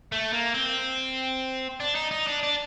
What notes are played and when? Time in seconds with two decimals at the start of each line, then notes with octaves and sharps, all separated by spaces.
0.12 A3
0.33 A#3
0.54 C4
1.80 D4
1.95 D#4
2.11 D#4
2.27 D4
2.43 D4